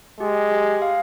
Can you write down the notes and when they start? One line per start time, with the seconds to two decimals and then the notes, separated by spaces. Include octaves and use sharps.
0.20 G#3 G4
0.51 G4
0.82 F5